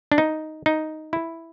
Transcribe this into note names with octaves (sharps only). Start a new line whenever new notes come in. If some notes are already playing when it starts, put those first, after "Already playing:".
D4
D#4
D#4
E4